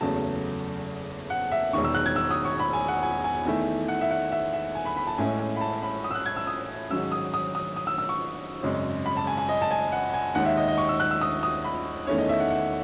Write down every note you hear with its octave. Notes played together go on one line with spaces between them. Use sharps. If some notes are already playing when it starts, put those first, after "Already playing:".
F#1 E2 C#3 F#3 A3 A5
F#5
E5
E1 E2 D#3 C#6
E6
F#6
G#6
E6
D#6
C#6
B5
G#5
F#5
G#5
G#5
E2 D#3 A3 E4
F#5
E5
F#5
E5
E5
G#5
B5
B5
A5
A1 A2 G#3 C#4 E4 G#5
G#5
B5
A5
B5
D#6
E6
F#6
G#6
E6
D#6
G#2 D#3 F#3 C#4 E6
D#6
D#6
D#6
D#6
E6
E6
C#6
G#1 F#2 C#3 G#3
B5
A5
G#5
G#5
D#5
A5
G#5
F#5
G#5
D#2 D#3 G#3 F#5
E5
D#5
D#5
C#6
E6
F#6
E6
D#6
D#6
B5
E2 D#3 A3 C#4 E4 C#5
D#5
E5
F#5
F#5